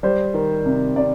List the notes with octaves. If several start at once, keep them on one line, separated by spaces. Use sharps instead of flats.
G3 C5
D#3
C3
C3 D5